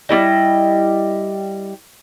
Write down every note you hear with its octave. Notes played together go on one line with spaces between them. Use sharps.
G3 C#4 E4 D#5